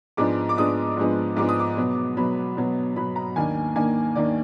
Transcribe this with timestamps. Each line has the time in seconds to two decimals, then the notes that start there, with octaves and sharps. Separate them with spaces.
0.17 G#2 F3 G#3 B3 D4 D6
0.49 D6
0.58 G#2 F3 G#3 B3 D4 D#6
0.97 G#2 F3 G#3 B3 D4
1.37 G#2 F3 G#3 B3 D4 D6
1.49 D#6
1.60 D6
1.77 B2 F#3 B3
2.17 B2 F#3 B3 B5
2.57 B2 F#3 B3
2.96 B2 F#3 B3 B5
3.16 A#5
3.36 D#2 D#3 A#3 D4 G#5
3.76 D#2 D#3 A#3 D4 G#5
4.15 D#2 D#3 A#3 D4 D5